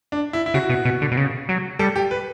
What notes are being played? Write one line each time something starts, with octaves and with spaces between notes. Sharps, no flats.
D4
E4
E4
C#3 F#4
B2
B2
D3
B2
C#3
F#3
G3 A4
G4
B4